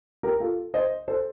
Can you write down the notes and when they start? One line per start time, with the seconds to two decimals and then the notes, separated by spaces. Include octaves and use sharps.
0.23 G4 A#4
0.40 F4 A4
0.74 C5 D#5
1.08 A4 C5